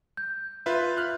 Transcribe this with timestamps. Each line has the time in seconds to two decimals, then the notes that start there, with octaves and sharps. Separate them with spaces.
0.17 G6
0.66 F4 B4 E5
0.97 F6 F#6